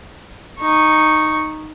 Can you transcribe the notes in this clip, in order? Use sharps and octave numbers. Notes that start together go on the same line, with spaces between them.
D#4 C#6